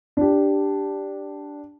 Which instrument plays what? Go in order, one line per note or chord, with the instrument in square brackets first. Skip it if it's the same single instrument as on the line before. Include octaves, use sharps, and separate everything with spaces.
[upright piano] D4 G4